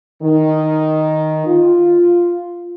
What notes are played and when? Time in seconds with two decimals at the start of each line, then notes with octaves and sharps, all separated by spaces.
0.22 D#3
1.47 F4